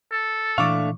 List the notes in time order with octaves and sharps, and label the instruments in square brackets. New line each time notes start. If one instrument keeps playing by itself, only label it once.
[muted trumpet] A4
[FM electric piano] A#2 E3 [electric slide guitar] A3 D4 F5 [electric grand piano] C#6 D6